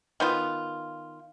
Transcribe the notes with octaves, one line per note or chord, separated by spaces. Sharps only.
D#3 B3 F4